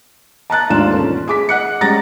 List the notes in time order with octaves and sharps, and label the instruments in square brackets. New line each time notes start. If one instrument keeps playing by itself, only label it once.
[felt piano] A5 A#5 F#6 A6
D#2 G#2 D4 F4 E7
E1 C#4 A4
G#4 D6 B6
D#5 F#5 F#6 C#7
G3 G#3 C#4 A#5 A6 A#6